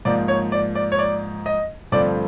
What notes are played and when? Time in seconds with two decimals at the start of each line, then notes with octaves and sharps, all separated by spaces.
0.05 G#2 F3 A#3 D5
0.28 C#5
0.52 D5
0.75 D5
0.92 C#5
0.99 D5
1.46 D#5
1.92 G2 D3 F3 A3 C4 D5